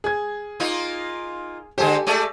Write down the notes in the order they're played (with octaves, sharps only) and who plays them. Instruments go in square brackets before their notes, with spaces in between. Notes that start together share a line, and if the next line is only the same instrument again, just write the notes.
[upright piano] G#4 G#6
[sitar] A#3 D#4 F4
[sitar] D3 G#3 C5 [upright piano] G4 A4 G#5
[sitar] G#3 A3 D5